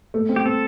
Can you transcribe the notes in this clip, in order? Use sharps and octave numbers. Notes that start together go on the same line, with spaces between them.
A3
C4
G4
C4 A4